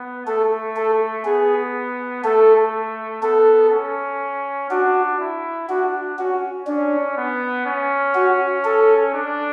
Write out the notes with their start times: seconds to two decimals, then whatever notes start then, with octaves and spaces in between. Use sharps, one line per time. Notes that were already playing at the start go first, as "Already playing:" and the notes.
Already playing: B3
0.26 A3 A4
0.76 A4
1.25 B3 G#4
2.24 A3 A4
3.22 B3 A4
3.72 C#4
4.70 D4 F#4
5.20 E4
5.69 D4 F#4
6.19 C#4 F#4
6.67 C#4 D4
7.17 B3
7.66 C#4
8.15 F#4
8.65 A4
9.14 D4